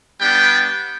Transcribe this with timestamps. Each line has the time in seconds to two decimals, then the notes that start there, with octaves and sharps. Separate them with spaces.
0.19 G3 B3 D4 G5